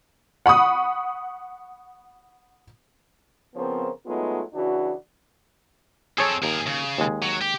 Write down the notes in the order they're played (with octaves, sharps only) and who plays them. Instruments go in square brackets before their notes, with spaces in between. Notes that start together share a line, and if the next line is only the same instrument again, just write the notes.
[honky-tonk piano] F#5 B5 C#6 D#6
[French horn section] C#3 F3 B3 C4 A#4 C5
F#3 G#3 A3 B3 D#4 F4
C#3 E3 D4 F#4
[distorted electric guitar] C4 A4 [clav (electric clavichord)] G#4 C#5 A5
[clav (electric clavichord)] D#2 [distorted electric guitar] G#4 A#4
[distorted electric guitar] C#3
[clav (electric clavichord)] D#2 G#3
[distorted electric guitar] F#3
G4